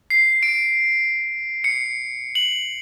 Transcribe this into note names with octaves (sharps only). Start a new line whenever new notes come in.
C7
D7
C#7
F#7